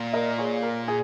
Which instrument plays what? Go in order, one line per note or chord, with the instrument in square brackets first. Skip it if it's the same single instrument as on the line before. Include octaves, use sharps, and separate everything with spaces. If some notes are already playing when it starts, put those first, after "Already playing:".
Already playing: [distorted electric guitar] A#2
[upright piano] A#4 D#5
G#4 C#5
A#4
G#4